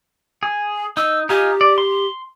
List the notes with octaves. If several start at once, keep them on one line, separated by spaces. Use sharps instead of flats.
G#4
D#4 E6
D#4 F4 G4 G#5
D5
C6